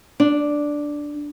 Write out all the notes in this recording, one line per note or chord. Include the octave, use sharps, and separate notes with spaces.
D4